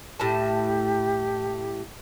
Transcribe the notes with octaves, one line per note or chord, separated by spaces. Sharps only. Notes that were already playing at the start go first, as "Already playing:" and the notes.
A2 G4 A5